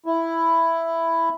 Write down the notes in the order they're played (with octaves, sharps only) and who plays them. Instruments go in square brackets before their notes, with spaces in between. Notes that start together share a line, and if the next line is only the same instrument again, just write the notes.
[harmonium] E4